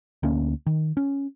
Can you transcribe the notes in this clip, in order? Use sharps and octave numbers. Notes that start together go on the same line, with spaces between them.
D2 A#3 C#4
D#3
C#4